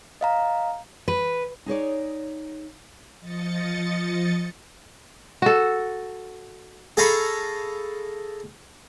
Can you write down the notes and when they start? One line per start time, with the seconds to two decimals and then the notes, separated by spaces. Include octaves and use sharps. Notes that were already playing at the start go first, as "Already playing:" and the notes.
0.21 D#5 F5 A#5
1.08 B4
1.66 D#4 G#4 C#5 D5
3.20 F3 D#5 A6 C#7
5.42 F#4 A4
6.97 G#4 A4 F5 A#5 B5 C#6